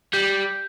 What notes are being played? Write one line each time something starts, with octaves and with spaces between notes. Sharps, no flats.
G3 G6